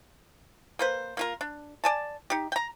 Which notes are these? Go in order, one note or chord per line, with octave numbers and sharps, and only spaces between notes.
A#3 B4 C5
A#3 F4 A#4
D4
D5 G#5 A5
D#4 G4
G5 A#5